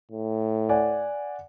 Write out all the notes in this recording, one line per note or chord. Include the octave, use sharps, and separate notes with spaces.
A2
D5 F#5 G#5